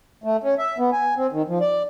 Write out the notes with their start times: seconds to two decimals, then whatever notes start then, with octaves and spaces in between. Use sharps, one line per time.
0.24 A3
0.44 C#4
0.58 E5
0.78 B3
0.92 G#5
1.17 C4
1.32 D#3
1.48 F3
1.61 D5